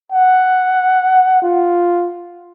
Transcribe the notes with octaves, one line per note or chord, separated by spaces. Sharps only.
F#5
F4